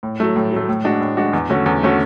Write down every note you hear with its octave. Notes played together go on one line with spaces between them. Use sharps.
A2
F#3 A3
A2
F#3 A3
A2
G#3 D4 F#4
A2
G#3 D4 F#4
E2
D3 A3 C#4 F#4
E2
D3 A3 C#4 F#4